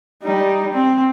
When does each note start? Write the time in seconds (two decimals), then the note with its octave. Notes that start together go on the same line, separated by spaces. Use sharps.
0.22 G3 D#4
0.72 C4